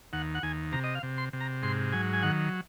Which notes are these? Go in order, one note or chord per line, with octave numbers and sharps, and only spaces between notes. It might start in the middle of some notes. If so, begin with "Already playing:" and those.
D#2 F#5
F#5
D#2 G#5
C3 A#5
D#5
F5
C3
C6
C3
A#5
G#2 C6
F#3 G#5
G#5
D#3 F#5